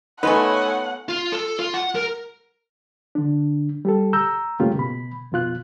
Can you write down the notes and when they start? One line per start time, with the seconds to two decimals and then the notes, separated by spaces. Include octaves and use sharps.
0.23 A3 B3 D#4 F4 B4 C#5 F#5 G#5
1.09 F4
1.32 A4
1.59 F4
1.74 F#5
1.95 A#4
3.15 D3 D4
3.85 G3 G4 A4
4.13 A#5 E6 G6
4.60 G2 C#3 A3 A#3 F4 G4
4.76 B2 B5
5.32 F2 B2 F4 F#6